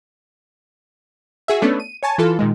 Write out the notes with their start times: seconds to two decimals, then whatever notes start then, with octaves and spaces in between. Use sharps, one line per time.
1.48 F#4 G#4 E5
1.62 A3 B3 C#4 D4 A4
1.80 D#7
2.03 C#5 G#5 A5
2.18 E3 F4 A4
2.39 A#2 D#3 G#3